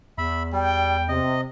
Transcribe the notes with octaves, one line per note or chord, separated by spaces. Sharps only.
E2 E5 B5
G3 G5
C3 D#5